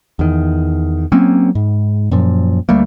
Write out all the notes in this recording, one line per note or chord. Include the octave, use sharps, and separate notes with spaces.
E2 D#3
F#3 A#3 C4 C#4
G#2
F#2 A#2 F3
D2 G3 A3 A#3